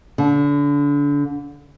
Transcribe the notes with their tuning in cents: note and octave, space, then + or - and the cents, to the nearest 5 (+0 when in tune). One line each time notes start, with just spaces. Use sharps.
D3 -30